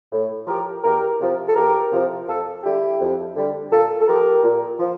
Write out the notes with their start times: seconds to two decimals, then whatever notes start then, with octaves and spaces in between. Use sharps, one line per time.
0.12 A2
0.47 F3 G4 A#4
0.83 E2 G4 A#4
1.20 C3 F3
1.48 A4
1.56 E2 G4 A#4
1.92 C3 F3
2.28 F2 F4 A4
2.64 D3 G3 E4 G4
3.00 F2
3.36 D3 G3
3.72 A#2 F4 A4
4.01 A4
4.08 F3 G4 A#4
4.44 A#2
4.80 F3